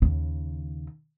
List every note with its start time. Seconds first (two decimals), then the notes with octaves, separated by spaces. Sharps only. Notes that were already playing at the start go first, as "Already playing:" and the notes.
0.02 D#2 C#3